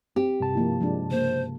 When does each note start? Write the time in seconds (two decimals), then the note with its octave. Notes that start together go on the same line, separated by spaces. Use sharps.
0.16 C4 G4
0.40 G2 C3 A5
0.55 F3 A#3 E4
0.80 F3 G#3 D4
1.11 C#3 A#3 C5